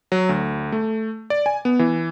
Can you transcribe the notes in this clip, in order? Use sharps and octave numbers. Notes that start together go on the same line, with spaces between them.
F#3
D2
A3
D5
G#5
B3
E3